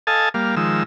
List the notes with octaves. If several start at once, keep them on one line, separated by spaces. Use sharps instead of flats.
A4 D#5 F5 G#5 A5
G3 A#3 F5
D#3 F3 G#3 E6